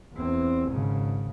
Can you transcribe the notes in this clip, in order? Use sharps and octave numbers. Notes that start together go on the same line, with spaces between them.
E2 C4
G#1 C#3